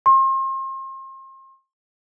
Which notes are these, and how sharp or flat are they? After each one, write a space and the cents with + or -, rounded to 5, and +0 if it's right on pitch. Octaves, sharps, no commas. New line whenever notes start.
C6 +40